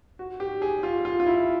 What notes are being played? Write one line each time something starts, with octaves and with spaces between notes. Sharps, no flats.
F#4
G4
G#4
F4
F4
F4
E4